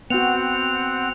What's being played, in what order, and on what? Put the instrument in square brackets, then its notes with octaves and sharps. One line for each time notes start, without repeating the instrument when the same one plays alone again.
[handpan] B3 F#4 [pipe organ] C4 F#5 [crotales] F7